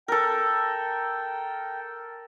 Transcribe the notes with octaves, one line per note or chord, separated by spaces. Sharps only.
A4 A#4 G5